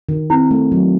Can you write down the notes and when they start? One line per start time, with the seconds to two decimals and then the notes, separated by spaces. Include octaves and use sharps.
0.09 D#3
0.30 C4 E4
0.51 A3
0.72 F#3